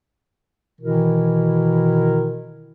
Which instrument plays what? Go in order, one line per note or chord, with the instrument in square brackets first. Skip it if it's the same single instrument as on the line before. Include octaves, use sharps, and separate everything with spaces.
[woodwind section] B2 D#3 E3 E4 A#4